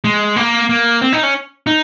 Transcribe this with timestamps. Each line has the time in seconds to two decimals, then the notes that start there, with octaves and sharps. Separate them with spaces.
0.04 G#3
0.36 A#3
0.69 A#3
1.01 C4
1.13 D#4
1.23 C#4
1.67 D#4